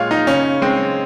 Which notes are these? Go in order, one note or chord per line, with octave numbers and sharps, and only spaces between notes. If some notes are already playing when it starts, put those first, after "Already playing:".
Already playing: A#2 G#3 F4 C#5
D#4
C#3 C#4
G#3 C4